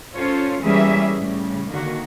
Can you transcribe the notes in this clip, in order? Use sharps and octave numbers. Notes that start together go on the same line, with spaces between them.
C#4 F4 A4 C5 C#5
E3 G3 A#3 C#4 G#4 E5
A2 C#3 G3
D3 D#3 A#3 F#4